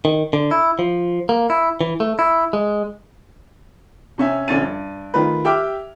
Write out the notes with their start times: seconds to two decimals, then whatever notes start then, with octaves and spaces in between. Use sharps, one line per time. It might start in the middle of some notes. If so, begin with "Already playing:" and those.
0.05 D#3
0.33 D3
0.51 E4
0.79 F3
1.29 A#3
1.50 E4
1.81 E3
2.00 A3
2.19 E4
2.53 G#3
4.18 C3 C#4 E5 G#5
4.48 A#1 D3 C#4 A6 D#7
4.61 G2
5.14 D#3 A3 F4 B4
5.45 G4 E5 G5 D6 F6